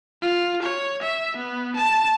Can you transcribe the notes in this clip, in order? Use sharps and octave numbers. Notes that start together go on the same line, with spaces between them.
F4
C#5
E5
B3
A5